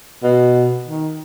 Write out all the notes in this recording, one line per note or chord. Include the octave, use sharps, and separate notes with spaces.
B2
D#3